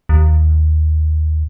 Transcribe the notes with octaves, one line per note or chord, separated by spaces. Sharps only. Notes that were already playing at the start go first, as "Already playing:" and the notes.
D#2